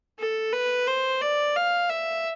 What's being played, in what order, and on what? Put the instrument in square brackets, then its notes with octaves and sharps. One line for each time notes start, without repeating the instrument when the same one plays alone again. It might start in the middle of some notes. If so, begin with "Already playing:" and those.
[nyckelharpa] A4
B4
C5
D5
F5
E5